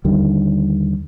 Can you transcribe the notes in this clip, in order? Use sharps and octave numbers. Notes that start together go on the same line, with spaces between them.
D#2 D3 D#3 G3